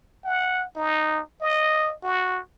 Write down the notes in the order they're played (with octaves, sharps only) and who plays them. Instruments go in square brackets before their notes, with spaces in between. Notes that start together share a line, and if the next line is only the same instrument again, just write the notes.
[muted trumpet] F#5
D#4
D#5
F#4